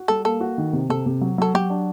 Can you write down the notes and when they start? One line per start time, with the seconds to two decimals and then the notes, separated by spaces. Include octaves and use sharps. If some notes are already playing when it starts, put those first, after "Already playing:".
Already playing: F#4
0.08 G3 A4
0.25 A#3 A4
0.41 F#4
0.58 D#3
0.73 C3
0.89 C3 A4
1.06 C3
1.21 F#3
1.38 F#3 A4
1.54 F#3 G4
1.70 D4